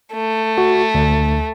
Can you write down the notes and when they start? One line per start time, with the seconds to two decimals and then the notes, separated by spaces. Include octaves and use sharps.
0.14 A3
0.58 F#4
0.95 D2